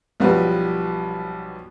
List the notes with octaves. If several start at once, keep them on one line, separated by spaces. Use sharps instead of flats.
B1 F3 G3 F#4 B4